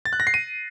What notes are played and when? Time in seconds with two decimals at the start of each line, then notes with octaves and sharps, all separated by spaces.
0.05 A6
0.13 F#6
0.20 A#6
0.27 C7
0.34 D#7